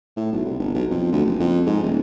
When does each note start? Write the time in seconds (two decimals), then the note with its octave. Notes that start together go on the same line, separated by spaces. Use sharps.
0.17 A2
0.33 B1
0.45 C2
0.59 G1
0.74 B1
0.91 F2
1.12 D2
1.25 F#1
1.40 F2
1.66 G#2
1.83 D#1